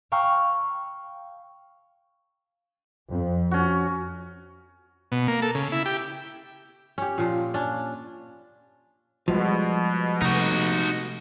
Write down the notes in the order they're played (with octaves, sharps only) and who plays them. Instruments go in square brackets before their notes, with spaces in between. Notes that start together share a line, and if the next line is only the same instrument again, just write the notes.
[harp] F5 G5 A#5 C#6 E6 F6
[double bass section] F2
[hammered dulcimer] C#4 F#4
[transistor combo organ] B2
A#3
A4
C#3
E4
G4
[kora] C#4 G4
A#2 F3
C#4 D4
[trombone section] B2 [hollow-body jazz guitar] F3 [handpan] G3 G#3 F#4
[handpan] C3 A3 B4 [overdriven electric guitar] D#4 F#4